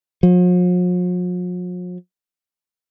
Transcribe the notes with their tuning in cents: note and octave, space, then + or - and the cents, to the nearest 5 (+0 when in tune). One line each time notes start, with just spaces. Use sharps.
F3 +45